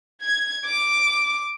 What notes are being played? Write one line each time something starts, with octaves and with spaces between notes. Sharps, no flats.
G#6
D6